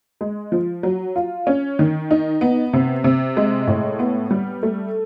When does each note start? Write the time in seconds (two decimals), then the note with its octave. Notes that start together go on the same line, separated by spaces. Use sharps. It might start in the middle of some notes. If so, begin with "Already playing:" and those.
0.21 G#3
0.52 F3
0.83 F#3
1.16 F4
1.47 C#4
1.79 D#3
2.11 D#4
2.41 B3
2.73 C3
3.04 C3
3.37 G#3
3.67 A2
3.99 B3
4.31 G3
4.63 A3